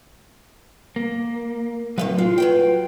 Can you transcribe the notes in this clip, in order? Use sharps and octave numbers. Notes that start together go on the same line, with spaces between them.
A#3
A2 C3 F#3 A3 B4 F5
G#3 F4
F#3 B4 G5